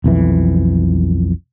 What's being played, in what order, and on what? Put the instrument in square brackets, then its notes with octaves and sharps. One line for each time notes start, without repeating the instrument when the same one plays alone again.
[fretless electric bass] B1 F2 E3